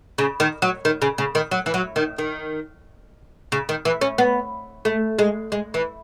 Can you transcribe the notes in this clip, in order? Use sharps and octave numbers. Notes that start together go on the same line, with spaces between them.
C#3
D#3
F#3
D#3
C#3
C#3
D#3
F#3
E3
F#3
D#3
D#3
C#3
D#3
E3
C#4
B3
A3
G#3
G#3
E3